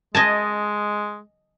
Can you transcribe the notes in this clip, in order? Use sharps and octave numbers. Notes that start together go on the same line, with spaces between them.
G#3 D#5 G#5 A5